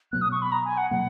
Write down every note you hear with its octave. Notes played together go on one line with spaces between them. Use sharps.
B2 F#3 B3 F#6
D#6
C#6
B5
A#5
G#5
F#5
B2 F#3 A#3 F#5